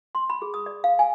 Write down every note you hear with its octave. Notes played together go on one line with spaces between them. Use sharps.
C6
B5
G#4
D#6
D5
F5
G#5